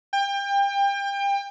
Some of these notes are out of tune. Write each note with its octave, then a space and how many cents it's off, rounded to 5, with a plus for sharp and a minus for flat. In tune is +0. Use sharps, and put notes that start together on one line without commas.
G5 +30